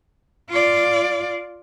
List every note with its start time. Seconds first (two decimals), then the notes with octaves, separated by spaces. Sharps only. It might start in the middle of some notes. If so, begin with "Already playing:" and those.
0.50 F4 D5